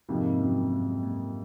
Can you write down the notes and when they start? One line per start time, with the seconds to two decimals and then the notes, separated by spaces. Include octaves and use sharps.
0.09 F2 G#2 C3 F3 A#3 D#4
0.41 F#2
0.72 G#2
1.03 A#2